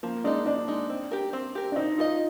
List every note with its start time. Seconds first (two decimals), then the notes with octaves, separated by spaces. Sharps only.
0.03 F3 A#3
0.24 G#3 D4 D#4
0.46 F3 D4
0.68 G#3 D#4
0.90 C4
1.11 G4 A#4
1.33 C4
1.55 G4 A#4
1.72 D4
1.76 C4 D#4
1.98 D#4 F4 A#4 D#5